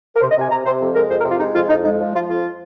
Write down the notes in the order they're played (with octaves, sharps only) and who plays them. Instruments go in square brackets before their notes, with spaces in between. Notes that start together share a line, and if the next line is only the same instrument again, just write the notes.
[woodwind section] A#4
C3 C5
D#5
C3 G#5
C3 A#5
C3 C5
F2
G#3 A#4
F2 C5
A#4
C3
F4
G#3 D#4
F2 F4
F2 D#4
G#3 D#4
F3
F3 F4
F2 F4